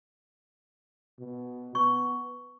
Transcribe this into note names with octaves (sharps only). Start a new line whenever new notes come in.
B2
B3 C#6